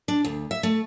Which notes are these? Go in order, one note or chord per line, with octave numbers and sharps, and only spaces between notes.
D4
D2
E5
A3